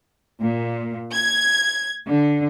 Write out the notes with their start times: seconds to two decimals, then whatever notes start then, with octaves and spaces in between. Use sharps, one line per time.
0.42 A#2
1.13 G#6
2.06 D3